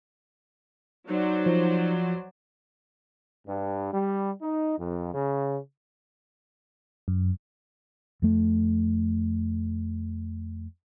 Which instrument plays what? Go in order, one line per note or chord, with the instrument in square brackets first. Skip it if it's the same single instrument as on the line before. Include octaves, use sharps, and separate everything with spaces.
[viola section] F#3 C5 D5 [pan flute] D#4
[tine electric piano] F3
[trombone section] G2
G3
D#4
F2
C#3
[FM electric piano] F#2
[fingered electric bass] F2 A3